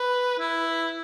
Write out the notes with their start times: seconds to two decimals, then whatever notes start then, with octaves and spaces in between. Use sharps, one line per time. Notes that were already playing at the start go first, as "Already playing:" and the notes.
Already playing: B4
0.39 E4